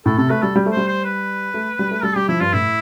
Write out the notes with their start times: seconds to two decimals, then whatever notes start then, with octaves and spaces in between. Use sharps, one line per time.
0.06 A2 A4
0.17 C3 A4
0.30 A3 B4
0.43 G3 A4
0.56 G3
0.66 A3
0.72 C5
0.77 G3
0.88 C5
1.05 B4
1.54 A3
1.79 G3
1.91 A3
2.03 G3 A4
2.16 G3 G4
2.29 F3 E4
2.41 G2 F4
2.53 A2 E4